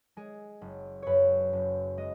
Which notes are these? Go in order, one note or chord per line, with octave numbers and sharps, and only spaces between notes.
G#3 G#4
F#1
F#2 B4 C#5
F#1
G#3 D#5